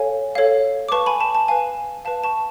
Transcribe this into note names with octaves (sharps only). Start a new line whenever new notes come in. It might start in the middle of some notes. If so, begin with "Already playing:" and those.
Already playing: A4 C#5 F5 G#5
A4 C#5 F5
D6
B4 F5 A5 C#6
G#5 B5
A5
A5
B4 F5 G#5
B4 F5 A5
A5 C#6